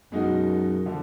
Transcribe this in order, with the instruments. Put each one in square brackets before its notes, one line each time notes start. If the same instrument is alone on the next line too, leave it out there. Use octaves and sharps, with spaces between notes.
[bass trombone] F#2 [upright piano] B2 G#3 D#4 F#4 A#4
[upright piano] D3 F3